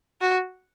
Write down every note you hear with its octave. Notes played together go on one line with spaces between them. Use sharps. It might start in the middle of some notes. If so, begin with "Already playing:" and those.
F#4